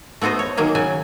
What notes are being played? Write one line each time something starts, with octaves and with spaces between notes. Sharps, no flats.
A3 B3 F#4 C5 D#5
C#5
D#3 F#3 A#3 G#4
C#3 F#3 G#5